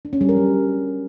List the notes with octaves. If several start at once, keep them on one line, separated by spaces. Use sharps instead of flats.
D4
C#4
G3
A#4
F#3